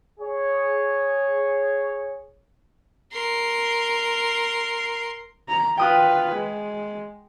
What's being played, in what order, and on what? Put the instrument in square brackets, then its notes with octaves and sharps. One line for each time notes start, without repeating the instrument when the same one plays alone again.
[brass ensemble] G#4 C#5
[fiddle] A#4 C6
[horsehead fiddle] A#5
[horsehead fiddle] F4 B4 [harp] G5 D#6 F#6
[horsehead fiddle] G#3